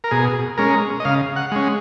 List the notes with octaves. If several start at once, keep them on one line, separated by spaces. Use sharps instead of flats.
A#4
B2 G#4
G#3 C#4 A#4
D#5
C#3 F5
F#5
G#3 C#4